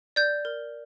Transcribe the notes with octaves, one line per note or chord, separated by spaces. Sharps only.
D5 G6
A#4